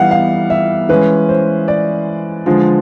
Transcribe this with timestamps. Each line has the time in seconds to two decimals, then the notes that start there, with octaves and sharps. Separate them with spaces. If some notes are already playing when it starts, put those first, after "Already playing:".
Already playing: E3 G3 B3 D#4 F5 F#5
0.11 F5
0.50 E5
0.89 E3 G#3 C#4 B4
1.29 C5
1.68 D5
2.46 D3 F3 G#3